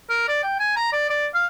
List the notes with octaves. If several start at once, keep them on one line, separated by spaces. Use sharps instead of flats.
A#4
D5
G5
G#5
A#5
D5
D5
F5